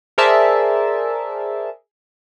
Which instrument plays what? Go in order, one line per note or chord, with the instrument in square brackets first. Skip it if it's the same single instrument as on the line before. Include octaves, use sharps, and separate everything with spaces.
[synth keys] G#4 A#4 C5 D5 E5 A5